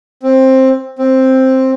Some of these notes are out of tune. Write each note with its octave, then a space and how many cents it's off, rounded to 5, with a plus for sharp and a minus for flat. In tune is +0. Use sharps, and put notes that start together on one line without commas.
C4 +10
C4 +5